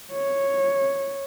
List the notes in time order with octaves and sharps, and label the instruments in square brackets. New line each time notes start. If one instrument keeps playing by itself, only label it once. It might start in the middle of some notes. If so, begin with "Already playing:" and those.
[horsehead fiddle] C#5